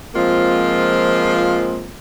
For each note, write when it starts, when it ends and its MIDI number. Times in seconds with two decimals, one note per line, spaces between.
0.15 1.91 53
0.15 1.91 56
0.15 1.91 58
0.15 1.91 60
0.15 1.91 65